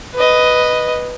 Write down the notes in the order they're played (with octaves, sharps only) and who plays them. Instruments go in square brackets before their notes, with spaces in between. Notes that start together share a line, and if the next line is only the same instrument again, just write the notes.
[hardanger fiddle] B4 D#5